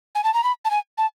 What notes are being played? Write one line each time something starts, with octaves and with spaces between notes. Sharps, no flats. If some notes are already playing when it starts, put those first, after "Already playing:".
G#5
A5
A#5
B5
A5
G#5
A5